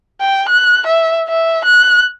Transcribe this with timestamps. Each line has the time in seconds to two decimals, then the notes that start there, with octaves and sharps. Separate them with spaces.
0.21 G5
0.49 F#6
0.87 E5
1.28 E5
1.65 F#6